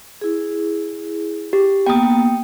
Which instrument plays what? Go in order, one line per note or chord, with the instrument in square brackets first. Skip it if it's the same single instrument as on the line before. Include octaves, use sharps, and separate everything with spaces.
[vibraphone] E4 G#4
[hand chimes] G4
[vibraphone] A#3 B3 [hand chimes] G5 D#6